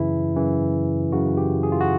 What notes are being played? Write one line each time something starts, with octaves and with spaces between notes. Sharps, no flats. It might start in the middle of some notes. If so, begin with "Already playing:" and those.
Already playing: F#2 C#3 E3 E4
F#2 C#3 E3
F#2 C#3 E3 F#4
G4
G#4
F4
F#4